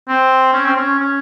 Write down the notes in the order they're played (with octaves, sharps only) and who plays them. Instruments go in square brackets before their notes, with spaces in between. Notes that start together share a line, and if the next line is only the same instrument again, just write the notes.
[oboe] C4
C#4
C4
C#4
C#4